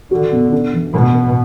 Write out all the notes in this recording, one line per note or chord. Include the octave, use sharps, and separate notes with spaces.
D3 F#4
B2
D4
E3
B2 A#4
A#3